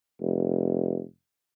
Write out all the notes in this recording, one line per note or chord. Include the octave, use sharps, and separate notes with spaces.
F1